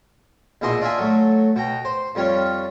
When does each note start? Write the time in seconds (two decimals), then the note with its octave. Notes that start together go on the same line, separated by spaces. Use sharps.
0.61 A#1 B2 G#3 E4 D#5 C6
0.81 D4 F4 E5 G#5
0.99 F#3 A3
1.56 B2 G5 A#5
1.85 C5
2.15 F2 G3 F4 C#5